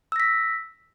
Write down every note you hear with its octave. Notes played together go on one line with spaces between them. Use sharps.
E6 A#6 B6